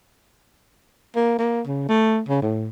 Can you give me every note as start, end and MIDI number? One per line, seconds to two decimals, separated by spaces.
1.15 1.38 58
1.38 1.61 58
1.67 1.88 49
1.88 2.21 57
2.28 2.41 49
2.42 2.69 45